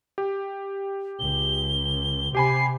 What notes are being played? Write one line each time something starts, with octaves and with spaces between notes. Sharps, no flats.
G4
C#2 G7
C3 G4 G#5 B5 C7